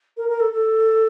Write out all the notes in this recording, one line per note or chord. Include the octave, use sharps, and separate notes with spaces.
A#4
A#4
A4
A4